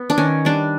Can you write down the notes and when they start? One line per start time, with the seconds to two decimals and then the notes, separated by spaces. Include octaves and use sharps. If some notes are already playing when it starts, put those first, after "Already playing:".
Already playing: B3
0.10 D4
0.18 D#3 C#4
0.45 G3 D4